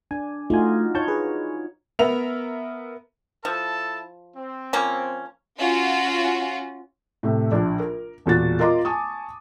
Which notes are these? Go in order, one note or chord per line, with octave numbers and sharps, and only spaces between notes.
D4 G#5
A3 D#4 F4 F#4 G#5
D#4 C#5 A5 C#6 G6
G#4 B4
B3 A#4 E5 F7
F3 E4 A4 A5
C4
F3 A#3 C#4
C#4 F4 F#4
A2 C3 A3
A#1 D4 D5
A#4
E1 A#2 F#4 A6
F4 A#4 D#5 A#5 C6 D6
G#5 A5 C#6 D#6